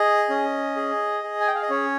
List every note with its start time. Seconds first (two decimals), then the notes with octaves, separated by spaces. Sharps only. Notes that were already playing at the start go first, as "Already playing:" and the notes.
Already playing: G#4 D#5
0.30 C#4
0.76 G#4
1.24 G#4
1.40 G#5
1.47 G5
1.55 F5
1.62 D#5
1.70 C#4 C#5